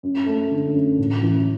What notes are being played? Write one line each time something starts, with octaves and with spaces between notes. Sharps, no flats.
F#2
A3
D3
F#2
A1
E3